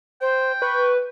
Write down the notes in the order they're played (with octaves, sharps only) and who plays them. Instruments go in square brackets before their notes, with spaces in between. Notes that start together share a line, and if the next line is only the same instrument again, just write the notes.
[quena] C5 [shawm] G5
[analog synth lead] B4 [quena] C#6